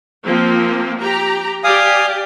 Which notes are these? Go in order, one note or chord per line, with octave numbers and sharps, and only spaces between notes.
F3 A#3 C4
G4 A#5
G4 D5 F5 G#5 D#6